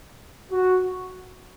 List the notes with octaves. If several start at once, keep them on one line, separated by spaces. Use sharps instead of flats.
F#4